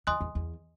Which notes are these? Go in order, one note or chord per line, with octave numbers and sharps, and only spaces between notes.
E2 D#5 G#5 C6 D#6 F#6
E2
E2